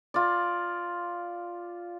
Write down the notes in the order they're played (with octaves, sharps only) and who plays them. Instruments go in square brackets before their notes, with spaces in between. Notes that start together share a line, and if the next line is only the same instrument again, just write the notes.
[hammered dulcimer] F4 D5